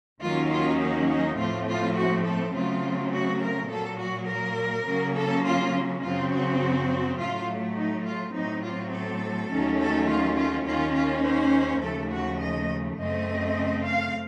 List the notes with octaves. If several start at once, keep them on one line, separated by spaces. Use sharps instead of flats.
D#2 D#3 F#3 A#3 C#4 F4
F4
D#4
D#4
A2 F3 A3 C4 F4
F4
F#4
A4
C#3 F#3 A3 C4 F4
F#4
A#4
A#2 F#3 A#3 A4
F#4
A#4
C#3 F#3 A#3 C#4
A4
F4
F#2 C#3 F#3 C4 F4
F#4
A2 F#3 A3 F4
D#4
F4
A2 F#3 C4 D#4
F4
A4
D#2 D#3 F#3 A3 C#4
A4
F4
F4
D#2 D#3 A#3 C#4 F4
F4
C5
D#2 C#3 F3 A3 A4
F#4
D#5
F#2 C#3 A3 C4 D#5
F5